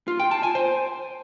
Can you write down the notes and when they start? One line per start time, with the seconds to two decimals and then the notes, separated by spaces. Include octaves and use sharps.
0.08 F4
0.20 G5
0.31 A5
0.43 G#5
0.55 C5